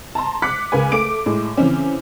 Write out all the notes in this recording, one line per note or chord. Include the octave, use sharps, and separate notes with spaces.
A5 A#5 C6
D6 F#6 B6 C#7
C#2 A#4 B4 G#5
A3 D6 D7
A2 G#3
C#3 E3 C4 C#4